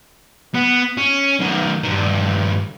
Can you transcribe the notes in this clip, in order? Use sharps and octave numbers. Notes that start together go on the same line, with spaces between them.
B3
C#4
F#2 D#3
G2 D#3